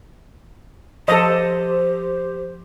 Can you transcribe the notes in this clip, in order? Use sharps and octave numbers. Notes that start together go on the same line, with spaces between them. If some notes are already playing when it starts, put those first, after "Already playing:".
F3 G4 A4 C5 D#5